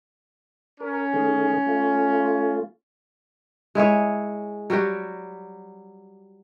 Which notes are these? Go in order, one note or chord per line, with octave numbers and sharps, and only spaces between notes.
C#4 A#4
D#3 A3 G#4
A3 F4
G#3 E4 G#4 C#5
F#3 G3 F#4 G4